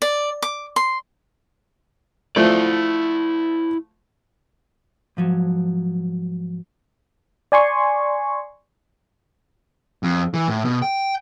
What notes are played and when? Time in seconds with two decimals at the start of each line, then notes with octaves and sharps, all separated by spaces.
0.02 D5
0.42 D6
0.76 C6
2.36 F3 A3 E4 D5
5.17 G#2 F3 F#3
7.52 D5 G#5 C6 C#6
10.03 F2
10.34 E3
10.48 A2
10.65 B2
10.82 G5